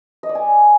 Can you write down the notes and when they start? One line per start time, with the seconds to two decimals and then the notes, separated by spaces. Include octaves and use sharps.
0.23 D#5
0.29 D5
0.35 G#5